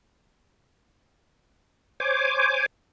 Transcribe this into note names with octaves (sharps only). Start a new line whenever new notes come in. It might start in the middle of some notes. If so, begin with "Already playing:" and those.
C5 C#5 G#5 D6